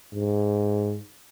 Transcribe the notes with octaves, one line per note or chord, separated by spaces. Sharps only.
G#2